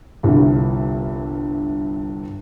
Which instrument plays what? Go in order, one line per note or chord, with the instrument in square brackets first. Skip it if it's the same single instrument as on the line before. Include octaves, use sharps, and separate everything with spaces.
[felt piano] G1 C2 G2